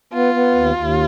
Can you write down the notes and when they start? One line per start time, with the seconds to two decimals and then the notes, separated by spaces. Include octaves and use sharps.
0.13 B3 F4
0.34 B3
0.55 D#2
0.75 D#2